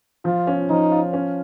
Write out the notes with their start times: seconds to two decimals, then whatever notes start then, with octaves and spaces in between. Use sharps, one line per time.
0.25 F3 F4
0.47 C#4
0.70 F3 D#4
0.92 F4
1.13 C#4